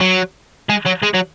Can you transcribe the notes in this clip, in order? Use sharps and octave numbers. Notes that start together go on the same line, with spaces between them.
F#3
G#3
F#3
G#3
F#3